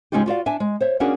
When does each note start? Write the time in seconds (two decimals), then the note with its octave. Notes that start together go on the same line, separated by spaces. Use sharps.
0.12 C#3 G#3 C#4 D#4 F4 G4
0.26 F4 F#4 D5 F5
0.46 D4 E5 G#5
0.60 G#3
0.81 C5 C#5 E5
1.00 A#3 C#4 D4 F#4 G#4 A#4